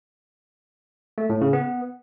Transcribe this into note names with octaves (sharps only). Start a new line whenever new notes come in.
A3
A2
C#3
B3